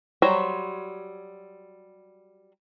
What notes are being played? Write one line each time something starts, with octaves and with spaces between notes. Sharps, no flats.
F#3 G3 C5 C#5 A#5